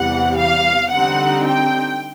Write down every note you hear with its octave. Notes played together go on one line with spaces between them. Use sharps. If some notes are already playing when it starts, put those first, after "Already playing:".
Already playing: E2 C3 E3 G3 F#5
F5
D3 G3 C4 D#4 F#5
G5